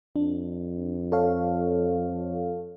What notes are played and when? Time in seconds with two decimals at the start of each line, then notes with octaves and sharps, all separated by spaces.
0.16 F2 D4
1.12 A4 C#5 F5